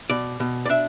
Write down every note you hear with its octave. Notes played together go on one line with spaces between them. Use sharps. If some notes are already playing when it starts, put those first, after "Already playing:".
B2 D5
B2
D5
D4 E5